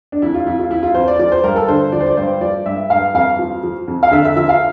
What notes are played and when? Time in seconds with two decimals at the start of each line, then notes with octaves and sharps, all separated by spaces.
0.12 D4
0.22 F2 E4
0.34 F4
0.46 F2 E4
0.59 F4
0.71 F3 E4
0.83 F4
0.95 F2 C5
1.08 D5
1.19 F3 D5
1.32 C5
1.44 G2 A#4
1.56 A4
1.68 D3 C5
1.92 F3 D5
2.00 C5
2.06 D5
2.17 G2 C5
2.41 F3 D5
2.66 G2 E5
2.90 G2 F5
3.14 F2 F5
3.39 F3
3.63 F3
3.88 F2
4.03 F5
4.11 D3 E5
4.25 E5
4.36 F3 E5
4.49 F5